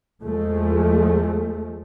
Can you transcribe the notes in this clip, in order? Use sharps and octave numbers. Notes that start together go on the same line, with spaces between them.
E2 F3 G#3 A3